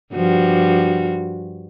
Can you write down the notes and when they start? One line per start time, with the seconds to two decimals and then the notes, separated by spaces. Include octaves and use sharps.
0.14 G2 F3 F#4